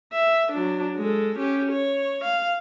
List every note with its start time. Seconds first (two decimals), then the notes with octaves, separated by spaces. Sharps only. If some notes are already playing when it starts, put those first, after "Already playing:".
0.13 E5
0.52 F#3 D4
0.97 G#3 A4
1.39 C#4 G4
1.72 C#5
2.25 F5